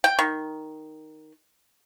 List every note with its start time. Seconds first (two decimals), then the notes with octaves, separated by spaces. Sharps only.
0.04 G5
0.19 D#3